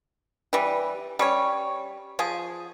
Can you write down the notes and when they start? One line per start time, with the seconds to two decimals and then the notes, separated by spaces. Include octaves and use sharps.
0.53 E3 G3
1.19 G3 C#4 C#5
2.19 F3 G#4